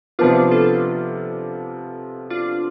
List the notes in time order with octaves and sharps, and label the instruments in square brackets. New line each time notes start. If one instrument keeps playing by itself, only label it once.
[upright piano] C3 F3 B3 [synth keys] D4 F4
[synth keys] F4 A4
D4 F4